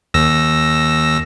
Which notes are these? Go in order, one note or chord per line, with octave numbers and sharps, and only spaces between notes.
D#2 E6 A#6